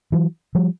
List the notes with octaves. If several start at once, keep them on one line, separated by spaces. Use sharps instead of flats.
E3 F#3
F3 G3